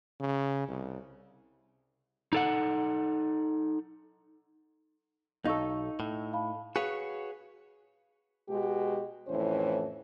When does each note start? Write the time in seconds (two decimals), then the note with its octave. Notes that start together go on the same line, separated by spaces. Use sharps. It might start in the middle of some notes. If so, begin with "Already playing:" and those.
0.20 C#3
0.68 C2
2.33 D#4 A4 F#5
5.45 B1 D#4 A4 F5 C#6 E6
6.00 A2
6.33 F5 A5 B5
6.76 F#4 G#4 B4 C#5 F5
8.49 B2 G#3 F#4 G4
9.28 F2 A2 E3 C#4 C5